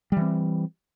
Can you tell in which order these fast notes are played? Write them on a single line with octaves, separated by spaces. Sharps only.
G3 E3 C4